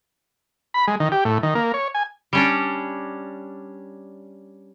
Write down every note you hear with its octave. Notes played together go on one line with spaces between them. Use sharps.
B5
G#3
D#3
G4
A2
D#3
A#3
C#5
G#5
G3 C#4 D4